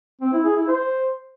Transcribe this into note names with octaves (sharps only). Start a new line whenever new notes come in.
C4
E4
G#4
E4
C5